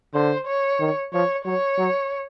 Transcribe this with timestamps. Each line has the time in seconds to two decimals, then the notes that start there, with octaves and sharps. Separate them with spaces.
0.14 D3 C5
0.47 C#5
0.80 D#3
1.13 F3 C#5
1.45 F#3 C#5
1.78 F#3